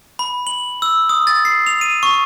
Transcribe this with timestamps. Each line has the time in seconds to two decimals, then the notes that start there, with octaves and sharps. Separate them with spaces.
0.19 B5
0.47 F#7
0.82 E6
1.09 D#6
1.27 A6
1.45 C7
1.67 F7
1.81 D#7
2.03 C#6